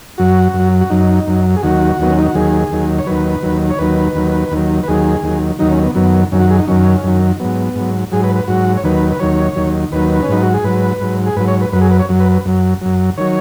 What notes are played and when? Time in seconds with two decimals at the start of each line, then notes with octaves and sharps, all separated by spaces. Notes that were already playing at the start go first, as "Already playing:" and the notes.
0.18 F#2 F#3 F#4
0.54 F#2
0.59 F#3
0.81 F#4
0.90 F#2 F#3 D#4
1.27 F#2 F#3
1.56 G#4
1.63 D#2 D#3 F#3 F#4
1.99 D#2 D#3 F#3 B3
2.11 C#4
2.19 D#4
2.27 F#4
2.35 D#2 D#3 F#3 G#4
2.71 D#2 D#3 F#3
2.98 C#5
3.06 D#2 D#3 F#3 B4
3.43 D#2 D#3 F#3
3.70 C#5
3.79 D#2 D#3 F#3 B4
4.15 D#2 D#3 F#3
4.51 D#2 D#3 F#3
4.83 B4
4.88 D#2 D#3 F#3 G#4
5.23 D#2 D#3 F#3
5.59 D#2 D#3 F#3 D#4
5.71 C#4
5.83 B3
5.95 F#2 D#3 F#3 B3
6.32 F#2 D#3 F#3 C#4
6.40 F#4
6.50 G#4
6.59 D#4
6.68 F#2 D#3 F#3 C#4
7.04 F#2 D#3 F#3
7.40 G#2 F#3 B3
7.75 G#2 F#3
8.11 G#2 F#3 G#4
8.24 B4
8.35 B4
8.48 G#2 F#3 F#4
8.77 C#5
8.84 D#2 D#3 F#3 B4
9.11 B4
9.20 D#2 D#3 F#3 C#5
9.56 D#2 D#3 F#3
9.92 D#2 D#3 F#3 B4
10.23 C#4
10.29 G#2 F#3 D#4
10.43 F#4
10.54 G#4
10.64 G#2 F#3 B4
11.01 G#2 F#3
11.26 G#4
11.36 G#2 F#3 B4
11.48 C#5
11.61 B4
11.72 F#2 F#3 B4
11.81 G#4
11.91 B4
11.99 C#5
12.09 F#2 F#3
12.20 B4
12.32 B4
12.45 F#2 F#3
12.81 F#2 F#3
13.17 D#3 F#3 C#5